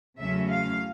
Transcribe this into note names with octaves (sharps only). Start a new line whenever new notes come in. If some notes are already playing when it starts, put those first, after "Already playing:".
E2 C#3 F#3 A3 C#4 E5
F5